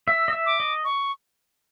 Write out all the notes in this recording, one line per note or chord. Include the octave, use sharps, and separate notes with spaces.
E5 E6
D#5
E5
D6
D#5
C#6